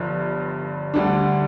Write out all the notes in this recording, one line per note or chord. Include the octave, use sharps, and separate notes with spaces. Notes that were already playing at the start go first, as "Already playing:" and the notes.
Already playing: G1 G2 F3
D2 D3 G3 D4